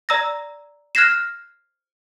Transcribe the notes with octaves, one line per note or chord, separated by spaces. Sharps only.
D5 A#5 E6 G#6 A#6
F6 F#6 G#6 A#6 C7 E7